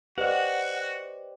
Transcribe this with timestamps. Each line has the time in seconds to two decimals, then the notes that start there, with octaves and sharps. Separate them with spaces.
0.18 F#4 G4 B4 C5 D5 D#5 F#5